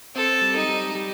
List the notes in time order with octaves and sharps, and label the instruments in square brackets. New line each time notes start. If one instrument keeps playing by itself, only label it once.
[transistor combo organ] C4 [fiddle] A4
[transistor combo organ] G3
[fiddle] D#4
[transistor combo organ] G3
G3